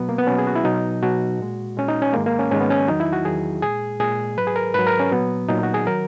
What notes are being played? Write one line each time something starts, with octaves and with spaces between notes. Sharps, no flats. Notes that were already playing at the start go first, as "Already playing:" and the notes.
Already playing: B2 F#3 B3
A#3
B3
B2 F#3 C#4
G#4
F#4
E4
B2 F#3 D#4
B2 F#3 F#4
A#2 G#3
A#2 G#3 C#4
D#4
C#4
G#2 D#3 G#3 A#3
A#3
C#4
G#2 D#3 G#3 C#4
B3
C#4
E2 D#3 F#3 D#4
E4
F#4
E2 D#3 F#3 G#4
A#2 G#3 G#4
A#2 G#3 G#4
G#2 F#3 B4
G#4
A#4
G#2 F#3 B4
A#4
C#4
A#2 F#3 B3
A#2 F#3 D#4
F#4
G#4
D#3 F#3 A#4